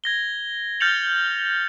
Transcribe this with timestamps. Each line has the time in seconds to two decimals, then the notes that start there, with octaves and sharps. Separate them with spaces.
0.04 G#6 A#6 G7
0.80 F6 G6 A6 C#7 F7 F#7